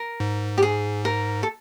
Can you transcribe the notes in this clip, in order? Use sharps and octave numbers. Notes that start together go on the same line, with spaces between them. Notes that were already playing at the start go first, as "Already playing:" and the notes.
Already playing: A#4
G#2
G4
G#4
A#4
A4